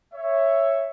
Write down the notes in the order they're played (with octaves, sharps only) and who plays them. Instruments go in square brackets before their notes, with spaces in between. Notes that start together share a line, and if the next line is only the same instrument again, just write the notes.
[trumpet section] C#5 E5